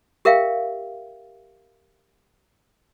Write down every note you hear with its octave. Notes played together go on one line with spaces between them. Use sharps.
G4 A#4 E5 F5 G5